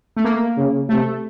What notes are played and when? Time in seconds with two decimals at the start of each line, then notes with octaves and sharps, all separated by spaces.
0.16 A3
0.24 A#3
0.57 C#3
0.89 C3 A3